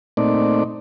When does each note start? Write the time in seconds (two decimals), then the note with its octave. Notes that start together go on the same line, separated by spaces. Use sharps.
0.17 A#2 A3 C4 D#4 D5